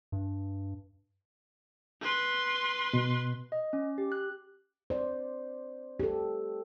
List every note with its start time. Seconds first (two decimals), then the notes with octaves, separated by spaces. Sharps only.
0.12 G2
2.02 B4 C6
2.93 B2
3.52 D#5
3.73 C#4
3.98 G4
4.12 F#6
4.90 C5 D5
6.00 G4 A4